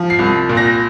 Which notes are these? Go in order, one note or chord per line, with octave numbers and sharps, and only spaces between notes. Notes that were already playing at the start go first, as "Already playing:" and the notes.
Already playing: F3
C7
C2
A#2
A#6